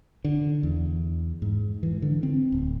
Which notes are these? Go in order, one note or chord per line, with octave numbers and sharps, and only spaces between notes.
D3
E2
G#2
E3
D3
C4
D1